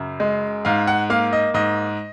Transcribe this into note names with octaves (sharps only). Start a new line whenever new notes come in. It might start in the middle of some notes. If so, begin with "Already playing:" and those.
Already playing: F#2 C#3
G#3
G#2 F5
F#5
A#3 F5
D#5
G#2 D#5